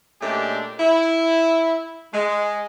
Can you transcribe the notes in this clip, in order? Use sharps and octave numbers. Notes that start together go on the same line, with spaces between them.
A#2 G#3 A3 C#4 D4 G4
E4
G#3